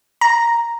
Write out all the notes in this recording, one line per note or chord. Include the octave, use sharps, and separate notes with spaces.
A#5